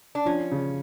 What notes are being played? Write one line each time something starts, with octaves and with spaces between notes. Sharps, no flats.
D4
F3 C#4
C#3